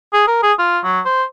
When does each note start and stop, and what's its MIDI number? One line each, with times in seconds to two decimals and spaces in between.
0.13 0.25 68
0.27 0.41 70
0.43 0.53 68
0.59 0.79 65
0.84 1.00 54
1.05 1.23 72